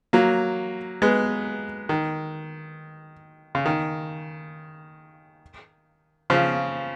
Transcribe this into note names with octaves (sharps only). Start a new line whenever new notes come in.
F#3 A#3
G#3 B3
D#3
C#3
D#3
C#3 F3